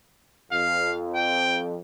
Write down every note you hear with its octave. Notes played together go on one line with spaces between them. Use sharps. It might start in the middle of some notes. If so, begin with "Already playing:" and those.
F2 F5
G5